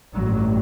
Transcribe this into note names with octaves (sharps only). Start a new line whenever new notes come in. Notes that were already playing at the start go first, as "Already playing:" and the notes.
A1 G2 F#3